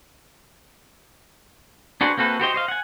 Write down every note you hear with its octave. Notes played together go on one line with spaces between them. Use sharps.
D4 F#4 G#4 B4 C5
A#3 C4 F#4 A4 B4
F#4 G4 C5 D#5
C5 D#5 F5
F#5 G#5